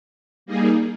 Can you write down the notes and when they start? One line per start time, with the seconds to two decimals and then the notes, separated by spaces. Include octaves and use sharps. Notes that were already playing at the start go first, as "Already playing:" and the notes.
0.46 G3 A#3 D#4 G#4